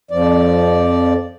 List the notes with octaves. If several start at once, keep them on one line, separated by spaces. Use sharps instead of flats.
F2 F3 D5